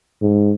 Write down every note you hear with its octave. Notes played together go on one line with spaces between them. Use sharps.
G#2